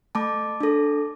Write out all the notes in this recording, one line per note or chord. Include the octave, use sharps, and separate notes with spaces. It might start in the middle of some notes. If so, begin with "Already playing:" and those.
A3 A5 D6
D4 A4